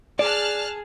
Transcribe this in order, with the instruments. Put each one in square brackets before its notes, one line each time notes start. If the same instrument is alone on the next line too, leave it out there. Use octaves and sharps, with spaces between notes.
[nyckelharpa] G#4 [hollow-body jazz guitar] D5 [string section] A5 F6 F#6